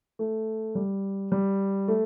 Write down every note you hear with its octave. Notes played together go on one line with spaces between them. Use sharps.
A3
G3
G3
A3